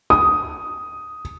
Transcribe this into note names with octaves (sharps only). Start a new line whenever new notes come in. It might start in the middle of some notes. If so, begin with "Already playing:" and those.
D#6